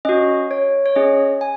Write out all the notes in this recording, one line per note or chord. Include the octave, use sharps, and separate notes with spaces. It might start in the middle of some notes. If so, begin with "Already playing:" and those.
C#4 F#4 D#5
C#5
C#5
C#4 G#4 D#5
G#5